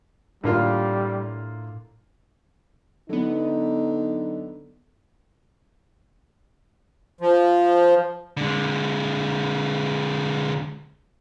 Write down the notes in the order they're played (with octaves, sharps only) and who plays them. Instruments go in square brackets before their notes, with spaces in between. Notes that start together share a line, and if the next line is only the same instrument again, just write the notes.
[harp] A2 [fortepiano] D3 A#3 F4 [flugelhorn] G3
[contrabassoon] D3 [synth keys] F#3 B3 [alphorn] D#4
[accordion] F3
[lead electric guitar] D3 G#3